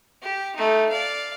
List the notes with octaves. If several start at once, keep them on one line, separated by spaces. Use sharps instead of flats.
G4
A3 D#4
D5 F5